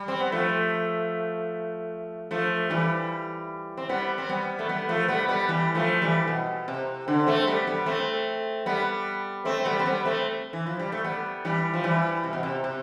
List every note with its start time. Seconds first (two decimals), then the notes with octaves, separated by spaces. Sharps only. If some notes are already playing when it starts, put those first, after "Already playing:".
Already playing: G3
0.08 C4
0.20 B3
0.32 F3 A3
2.31 F3 A3
2.70 E3 G3
3.77 C4
3.89 G3 B3
4.18 C4
4.29 G3 B3
4.59 A3
4.69 G3 B3
4.89 F3 A3
5.08 G3 B3
5.28 G3 B3
5.48 E3 G3
5.75 F3 A3
6.02 E3 G3
6.27 B2
6.68 C3
7.08 D3
7.27 A3 C4
7.47 G3 B3
7.67 G3 B3
7.86 A3 C4
8.66 G3 B3
9.45 A3 C4
9.65 G3 B3
9.79 C4
9.85 G3 B3
10.05 A3 C4
10.53 E3
10.66 F3
10.79 G3
10.92 A3
11.04 G3 B3
11.45 E3 G3
11.74 F3
11.84 E3 G3
12.23 C3
12.33 B2
12.43 C3
12.64 C3